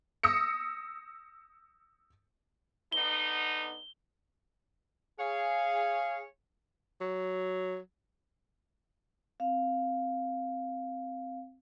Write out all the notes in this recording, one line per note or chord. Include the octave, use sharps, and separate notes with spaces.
D#6 E6 A#6 C#7
D3 B3 D#4 G7
G#4 C#5 F5
F#3
C4 F5